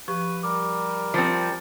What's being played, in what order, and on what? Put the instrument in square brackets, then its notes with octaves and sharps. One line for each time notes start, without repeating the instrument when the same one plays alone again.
[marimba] F3 G4 [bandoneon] B4 [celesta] C#6
[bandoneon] G3 A#4 [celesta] D6
[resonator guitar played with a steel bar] F3 C4 [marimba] C5 [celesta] D6 A6 C#7